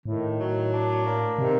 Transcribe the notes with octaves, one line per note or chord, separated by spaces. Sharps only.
A2 D#3
F#3
D4
A#3
C3 D#3